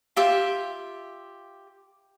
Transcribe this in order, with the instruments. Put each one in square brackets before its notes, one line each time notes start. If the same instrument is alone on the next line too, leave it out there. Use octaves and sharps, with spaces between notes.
[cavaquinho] F4 G4 E5